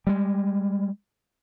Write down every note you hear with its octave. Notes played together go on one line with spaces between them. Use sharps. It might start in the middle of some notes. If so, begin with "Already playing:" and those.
G3 G#3